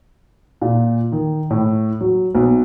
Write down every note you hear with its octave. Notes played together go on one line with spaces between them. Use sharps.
A#2
D#3
A2
F#3
B1